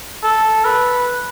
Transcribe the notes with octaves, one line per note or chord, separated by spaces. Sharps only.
A4
B4